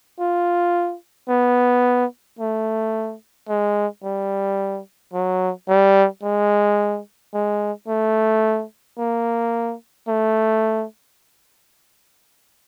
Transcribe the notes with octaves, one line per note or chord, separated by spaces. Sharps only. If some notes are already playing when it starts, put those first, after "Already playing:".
F4
B3
A3
G#3
G3
F#3
G3
G#3
G#3
A3
A#3
A3